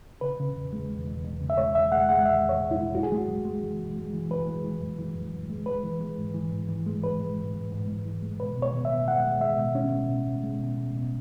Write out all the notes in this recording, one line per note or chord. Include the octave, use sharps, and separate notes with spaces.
C#3 B4
C#3
E2
G#3
E2
E2
E2
C#3
E5
G#3 C#5
E2 E5
G#3 F#5
G#3 F#5
E2 E5
E2
C#5
G#3
E4
G#3
F#2 F#4
G#4
G#3 F#4
F#2
G#3
E3
E3
G#3
E3
E3 B4
G#3
E3
F#2
E3
F#2
F#2
G#3
G#3 B4
E3
G#3
G#2
E3
G#2
E3
G#3
E3 B4
G#3
G#2
G#2
G#2
G#2
E3
G#3
B2 B4
B2
C#5
B2
E5
B2
G#3 F#5
G#3
G#3 E5
B2
B2 C#4
B2
B2
B2
G#3
B2
B2
B2